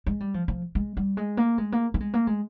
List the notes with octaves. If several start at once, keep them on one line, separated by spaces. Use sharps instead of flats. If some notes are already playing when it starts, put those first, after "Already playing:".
G#3
G3
F3
F3
G#3
G3
G#3
A#3
G#3
A#3
A#3
G#3
A#3
G#3